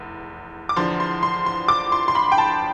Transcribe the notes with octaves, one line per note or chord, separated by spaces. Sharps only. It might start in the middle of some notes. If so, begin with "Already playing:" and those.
Already playing: F1 E2
D6
E2 D3 F3 C6
C6
C6
C6
D6
C6
C6
B5
G5
A5